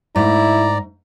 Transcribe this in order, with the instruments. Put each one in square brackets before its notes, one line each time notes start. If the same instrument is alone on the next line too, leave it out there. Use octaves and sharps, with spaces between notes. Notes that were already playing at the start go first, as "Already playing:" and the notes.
[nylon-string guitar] G#2 A3 [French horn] E4 [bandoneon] D5 [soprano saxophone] A#5